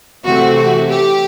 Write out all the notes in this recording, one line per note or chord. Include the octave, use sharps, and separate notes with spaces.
C3 E3 A3 C4 F#4
F#4
G4